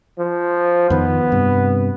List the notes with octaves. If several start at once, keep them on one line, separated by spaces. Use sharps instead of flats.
F3
F2 D#3 B3
G2 C3